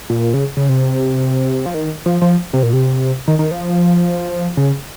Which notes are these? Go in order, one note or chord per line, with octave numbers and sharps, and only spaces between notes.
A#2
C#3
C#3
C3
F3
D#3
F3
F3
C3
A#2
C3
D#3
D#3
F3
C#3